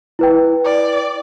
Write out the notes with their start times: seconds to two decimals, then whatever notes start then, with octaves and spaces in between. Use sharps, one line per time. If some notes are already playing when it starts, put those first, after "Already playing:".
0.19 E4 B4 G5
0.64 D5